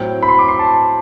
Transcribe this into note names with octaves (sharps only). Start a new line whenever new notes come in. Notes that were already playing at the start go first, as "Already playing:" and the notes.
Already playing: A2 F#3 C4 G5
B5
C6
D6
C6
A5